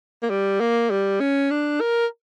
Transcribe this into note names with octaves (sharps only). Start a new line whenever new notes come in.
A#3
G3
A#3
G3
C#4
D4
A#4